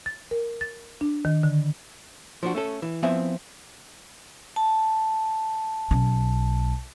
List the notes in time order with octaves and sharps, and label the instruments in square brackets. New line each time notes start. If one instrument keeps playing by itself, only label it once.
[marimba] A6
A#4
A6
D4
D#3
D3
[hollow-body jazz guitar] F3 D4 F#4
A3 C#4 A4
E3
F3 B3 C4 E4 E5 G#5
[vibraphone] A5
[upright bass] B1 C#4